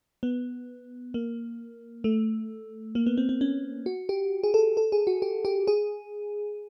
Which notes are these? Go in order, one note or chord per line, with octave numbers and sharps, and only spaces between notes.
B3
A#3
A3
A#3
B3
C4
C4
C#4
F#4
G4
G#4
A4
A4
G#4
F#4
G4
G4
G#4